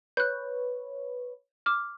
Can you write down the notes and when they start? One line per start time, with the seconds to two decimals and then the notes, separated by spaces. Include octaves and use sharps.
0.17 B4 C#5 F#6 G6
1.66 D6 F6